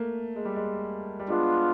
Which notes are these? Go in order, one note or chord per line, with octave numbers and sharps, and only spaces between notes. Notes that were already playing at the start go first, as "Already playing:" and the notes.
Already playing: A3 A#3
G#3
G3
G#3
G3
G#3 B3 D4 F4